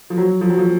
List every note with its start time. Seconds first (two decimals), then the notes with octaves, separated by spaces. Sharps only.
0.10 F3
0.17 F#3
0.41 F3
0.50 F#3
0.58 F3